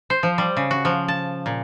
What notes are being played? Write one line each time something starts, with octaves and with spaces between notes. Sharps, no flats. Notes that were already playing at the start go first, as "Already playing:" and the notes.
C5
F3
G3
C#3
F#4
F3
A5
A#2